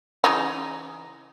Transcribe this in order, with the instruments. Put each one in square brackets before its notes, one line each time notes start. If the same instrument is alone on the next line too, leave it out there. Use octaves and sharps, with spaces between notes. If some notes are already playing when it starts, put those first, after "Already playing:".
[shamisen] C#3 E3 D#4